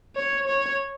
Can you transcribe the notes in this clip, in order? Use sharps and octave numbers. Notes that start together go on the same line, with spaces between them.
C#5
C#5